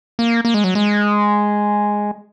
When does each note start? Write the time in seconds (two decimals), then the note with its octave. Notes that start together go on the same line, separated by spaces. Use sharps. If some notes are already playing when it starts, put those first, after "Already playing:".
0.19 A#3
0.45 A#3
0.54 G#3
0.64 F#3
0.75 G#3